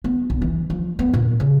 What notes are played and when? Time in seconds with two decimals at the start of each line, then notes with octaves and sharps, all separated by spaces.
0.04 B3
0.30 B1
0.42 E3
0.70 F3
0.99 B3
1.14 A#2
1.40 C#3